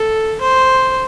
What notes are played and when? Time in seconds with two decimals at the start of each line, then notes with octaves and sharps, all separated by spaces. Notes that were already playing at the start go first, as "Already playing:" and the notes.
Already playing: A4
0.41 C5